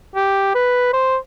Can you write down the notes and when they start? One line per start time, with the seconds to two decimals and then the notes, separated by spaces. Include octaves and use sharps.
0.16 G4
0.55 B4
0.93 C5